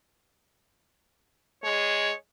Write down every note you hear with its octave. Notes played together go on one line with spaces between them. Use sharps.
G#3 C#5